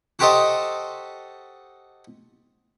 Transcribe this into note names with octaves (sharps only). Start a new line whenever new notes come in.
F#4 G4 A4 C5 D#5 A5